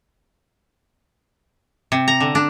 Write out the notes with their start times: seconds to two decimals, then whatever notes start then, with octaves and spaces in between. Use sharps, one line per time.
1.92 C3
2.08 A#5
2.20 D3
2.35 D4